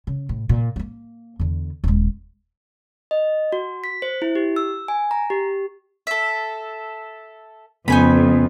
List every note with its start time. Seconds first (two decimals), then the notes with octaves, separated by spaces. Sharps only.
0.07 C#3
0.29 A2
0.49 A#2
0.76 A3 A#3
1.40 E2 D3
1.84 D#1 G#3
3.11 D#5
3.52 F#4
3.84 B6
4.02 C5
4.22 E4
4.35 G4
4.56 E6
4.88 G#5
5.11 A#5
5.30 G4
6.07 A4 E5
7.88 F2 C#3 A3 B3 D#4 G#5 B5